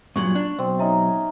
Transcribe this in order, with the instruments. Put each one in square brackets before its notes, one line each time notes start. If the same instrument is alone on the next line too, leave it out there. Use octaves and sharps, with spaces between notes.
[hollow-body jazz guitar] G2 A#2 F#3 [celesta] C#6 F#7
[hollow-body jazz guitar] D4
[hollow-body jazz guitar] B1 [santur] C4
[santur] C#4 D#4 D#5 [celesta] E5 A#5